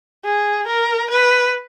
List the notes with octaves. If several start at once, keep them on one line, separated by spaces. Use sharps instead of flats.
G#4
A#4
B4